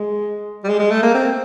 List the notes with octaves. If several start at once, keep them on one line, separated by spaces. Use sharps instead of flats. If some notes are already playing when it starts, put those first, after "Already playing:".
Already playing: G#3
G3
G#3
G#3
A3
A#3
C4